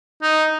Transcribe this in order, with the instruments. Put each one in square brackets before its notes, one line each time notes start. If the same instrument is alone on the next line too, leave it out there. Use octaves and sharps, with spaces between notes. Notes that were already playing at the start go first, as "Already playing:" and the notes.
[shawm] D#4